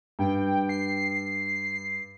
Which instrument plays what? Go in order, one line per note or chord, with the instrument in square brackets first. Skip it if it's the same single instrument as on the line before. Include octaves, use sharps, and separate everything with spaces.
[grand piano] G2 [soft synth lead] G5
[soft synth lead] C7